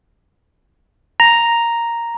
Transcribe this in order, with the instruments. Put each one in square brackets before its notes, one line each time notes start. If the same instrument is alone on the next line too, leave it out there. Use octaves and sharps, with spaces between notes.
[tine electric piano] A#5